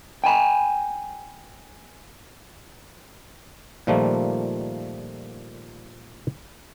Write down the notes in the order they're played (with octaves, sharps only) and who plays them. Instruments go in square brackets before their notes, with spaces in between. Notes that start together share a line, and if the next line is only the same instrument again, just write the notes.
[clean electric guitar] G5 G#5 B5
[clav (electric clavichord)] A#2 D#3 F3 G3 A3 A#3